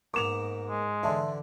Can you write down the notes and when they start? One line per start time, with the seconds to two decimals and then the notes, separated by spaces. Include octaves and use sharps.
0.14 G#2 A#3 B3 D6 E7 F7
0.67 G#3
1.03 D3 E3 D4 E5 A5 C6